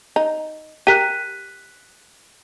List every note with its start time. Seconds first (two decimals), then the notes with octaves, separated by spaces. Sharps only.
0.16 D#4
0.87 G4 A#4 F#6 B6 D#7